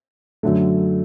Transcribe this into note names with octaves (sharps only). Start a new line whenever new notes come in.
F#2 D3 F#3 A3